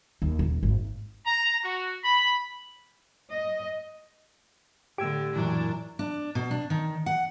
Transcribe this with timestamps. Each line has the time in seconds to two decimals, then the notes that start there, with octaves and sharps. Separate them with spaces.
0.22 D#2
0.39 D#1
0.63 G#1
1.24 A#5
1.63 F#4
2.03 B5
3.31 D#5
4.98 A2 D3 G4 E6 G#6 D7
5.35 F#2 A#2 E3 D4
5.99 D4
6.35 B2
6.51 D4
6.70 D#3
7.06 F#5